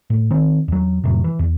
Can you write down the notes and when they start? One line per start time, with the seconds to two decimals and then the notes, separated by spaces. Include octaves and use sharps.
0.10 A2
0.31 D#3 C4
0.68 E2 F#3
1.04 F2 A2 C3 F#3
1.24 E3
1.39 E2